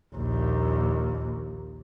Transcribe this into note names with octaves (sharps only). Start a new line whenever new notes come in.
A#1 D#2